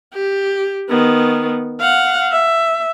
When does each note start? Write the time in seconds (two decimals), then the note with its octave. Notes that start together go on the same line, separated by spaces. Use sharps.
0.14 G4
0.89 D#3 B3
1.80 F5 F#5
2.32 E5